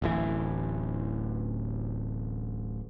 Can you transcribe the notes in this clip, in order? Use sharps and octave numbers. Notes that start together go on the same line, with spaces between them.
D1 A1 E3